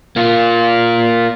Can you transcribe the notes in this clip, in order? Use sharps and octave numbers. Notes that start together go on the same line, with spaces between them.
A#3 F4